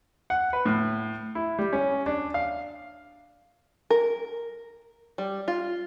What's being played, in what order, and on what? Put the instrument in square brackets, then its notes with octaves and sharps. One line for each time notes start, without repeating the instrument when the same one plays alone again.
[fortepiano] F#5
B4
A2
E4
G3
C#4
D4
F5
[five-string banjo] A#4
G3
F4